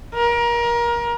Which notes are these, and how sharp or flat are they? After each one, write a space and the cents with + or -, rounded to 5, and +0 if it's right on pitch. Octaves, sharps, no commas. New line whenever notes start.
A#4 +25